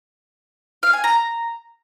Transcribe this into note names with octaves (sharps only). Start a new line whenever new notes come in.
F5
G#5
A#5